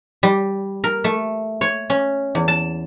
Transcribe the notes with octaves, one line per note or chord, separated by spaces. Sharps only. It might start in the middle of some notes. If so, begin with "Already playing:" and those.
G3
A#4
A3
C#5
C#4
E2
A5